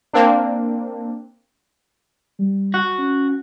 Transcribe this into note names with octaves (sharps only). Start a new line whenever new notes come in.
A#3 C4 D4
G3
F#4
C#4